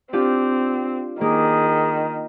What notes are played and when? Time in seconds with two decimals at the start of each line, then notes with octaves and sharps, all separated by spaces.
0.13 C4 D4 F4 G4
1.21 D#3 A#3 G#4